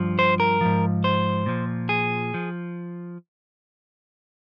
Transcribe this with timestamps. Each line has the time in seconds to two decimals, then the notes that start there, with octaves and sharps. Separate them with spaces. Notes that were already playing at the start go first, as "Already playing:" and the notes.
Already playing: G2 F3
0.19 C5
0.40 A#4
0.61 G#2 F3
1.04 C5
1.46 A#2 F3
1.89 G#4
2.34 F3